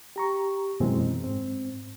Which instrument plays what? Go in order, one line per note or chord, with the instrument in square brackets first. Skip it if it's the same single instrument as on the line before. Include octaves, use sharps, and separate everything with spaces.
[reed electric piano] G4 A#5 C#6
F#2 B2 E3 G#3 C4
G#2 C4